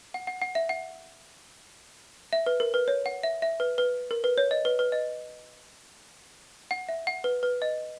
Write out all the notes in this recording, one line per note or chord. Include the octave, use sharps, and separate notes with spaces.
F#5
F#5
F#5
E5
F#5
E5
B4
A#4
B4
C#5
F#5
E5
E5
B4
B4
A#4
B4
C#5
D#5
B4
B4
D#5
F#5
E5
F#5
B4
B4
D#5